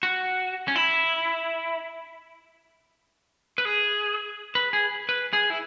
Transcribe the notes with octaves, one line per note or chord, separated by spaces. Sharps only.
F#4
C#4
E4
B4
G#4
B4
G#4
B4
G#4
E4